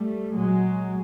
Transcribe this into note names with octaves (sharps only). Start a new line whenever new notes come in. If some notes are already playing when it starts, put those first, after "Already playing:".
Already playing: G3 A3
A#2 F#3 G#3